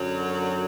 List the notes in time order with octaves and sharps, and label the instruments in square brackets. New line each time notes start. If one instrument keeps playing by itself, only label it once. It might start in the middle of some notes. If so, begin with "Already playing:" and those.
Already playing: [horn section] F#2 D3 F#3